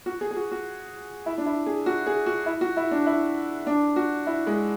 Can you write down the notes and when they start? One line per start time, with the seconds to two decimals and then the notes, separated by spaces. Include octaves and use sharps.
0.06 F#4
0.21 G#4
0.31 G#4
0.37 F#4
0.52 F#4
1.26 E4
1.38 D4
1.46 E4
1.66 G#4
1.86 F#4
2.07 G#4
2.26 F#4
2.46 E4
2.61 F#4
2.77 E4
2.91 D4
3.06 E4
3.67 D4
3.96 F#4
4.27 E4
4.47 G#3